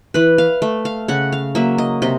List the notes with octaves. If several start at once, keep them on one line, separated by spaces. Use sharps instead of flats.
E3 B4
F5
A3
F5
C#3 F#5
F5
F#3 A#3 E5
D#5
C3 D#5